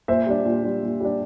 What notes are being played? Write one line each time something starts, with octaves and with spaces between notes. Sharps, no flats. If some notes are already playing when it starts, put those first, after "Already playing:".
A#2 C5 E5
G3 D4
A#2
G3 D4
A#2
G3 D4